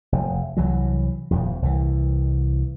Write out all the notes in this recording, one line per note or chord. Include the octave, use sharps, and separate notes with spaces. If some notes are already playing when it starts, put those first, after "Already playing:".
F1
C2 E3 F#3
D#1 F2
C2 E3